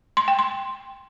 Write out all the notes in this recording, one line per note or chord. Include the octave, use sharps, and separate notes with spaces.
C6
G5
C6